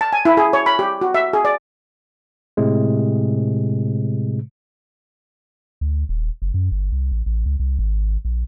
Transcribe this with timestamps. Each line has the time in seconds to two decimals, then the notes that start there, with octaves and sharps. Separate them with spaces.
0.01 A5
0.13 G#5
0.25 E4
0.37 G#4
0.53 C#5
0.66 B5
0.79 G4
1.01 F#4
1.14 E5
1.33 G#4
1.45 D5
2.57 A2 C3 G#3
5.81 D2
6.09 D#1
6.42 F#1
6.54 F#2
6.71 G1
6.92 C2
7.12 A1
7.26 A1
7.46 C#2
7.59 C2
7.79 G#1
8.25 A#1